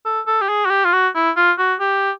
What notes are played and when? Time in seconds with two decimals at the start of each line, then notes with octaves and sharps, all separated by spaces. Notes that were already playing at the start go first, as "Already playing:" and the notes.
0.05 A4
0.27 A4
0.42 G4
0.49 G#4
0.65 F#4
0.70 G4
0.85 F4
0.93 F#4
1.15 E4
1.37 F4
1.59 F#4
1.80 G4